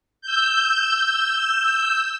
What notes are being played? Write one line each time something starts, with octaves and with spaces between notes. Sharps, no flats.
E6 G6